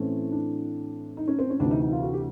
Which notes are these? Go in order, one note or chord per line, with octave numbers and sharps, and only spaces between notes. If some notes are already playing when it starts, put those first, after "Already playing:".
Already playing: A2 E3 A3 C4 C#4
D4
D#4
C#4
C4
C#4
D2 C3 E3 D4
D#4
D#4
F4
F#4
G4